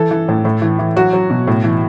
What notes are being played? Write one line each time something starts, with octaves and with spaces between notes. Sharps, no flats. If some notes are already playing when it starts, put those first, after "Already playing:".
Already playing: E3 A4
E3
A2
A2
E3
E3
F#3 F#4
F#3
B2
A2
E3